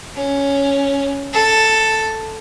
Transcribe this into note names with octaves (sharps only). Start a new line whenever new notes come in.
C#4
A4